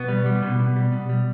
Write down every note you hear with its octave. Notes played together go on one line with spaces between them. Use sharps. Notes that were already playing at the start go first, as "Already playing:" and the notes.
Already playing: B2 B3
G3
G3
B2
B2
G3
B2
G3